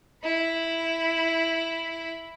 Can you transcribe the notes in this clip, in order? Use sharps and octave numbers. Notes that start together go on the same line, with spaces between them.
E4 B5